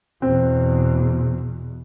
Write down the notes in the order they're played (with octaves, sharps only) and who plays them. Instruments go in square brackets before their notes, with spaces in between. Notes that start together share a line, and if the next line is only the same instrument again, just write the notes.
[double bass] E2 B2 [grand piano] C4